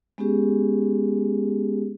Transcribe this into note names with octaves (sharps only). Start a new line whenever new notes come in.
G#3 B3 C#4 G4 G#4